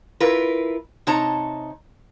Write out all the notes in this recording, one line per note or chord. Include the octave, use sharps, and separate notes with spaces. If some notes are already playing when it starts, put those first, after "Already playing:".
E4 F4 A#4 B4
C3 D#4 C#5 A5 A#5